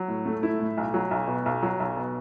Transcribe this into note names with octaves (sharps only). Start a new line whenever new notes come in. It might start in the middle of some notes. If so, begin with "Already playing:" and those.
Already playing: F#3
A2
A3
E4
A2
B1
F#3
B1
B2
B1
F#3
B1
B2